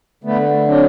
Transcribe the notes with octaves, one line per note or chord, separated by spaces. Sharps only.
D3 A3 B3
F#3 C4 D4